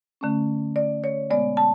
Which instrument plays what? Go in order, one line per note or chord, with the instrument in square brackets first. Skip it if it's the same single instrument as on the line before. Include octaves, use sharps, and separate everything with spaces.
[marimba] D3 A3 C#4
D5
C#5
B2 G#3 B3 D5
A5